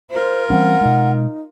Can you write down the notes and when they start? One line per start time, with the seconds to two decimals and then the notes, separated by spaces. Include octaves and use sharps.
0.11 F4 A#4 C5
0.50 E3 G3 C4 C#4 F#5
0.81 B2 G#3 D#4